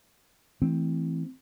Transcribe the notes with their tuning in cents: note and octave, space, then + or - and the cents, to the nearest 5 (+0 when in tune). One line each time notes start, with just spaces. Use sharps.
E3 -5 A3 +0 C4 +0